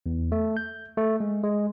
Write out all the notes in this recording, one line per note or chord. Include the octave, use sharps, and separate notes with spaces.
E2
A3
G6
A3
G#3
G#3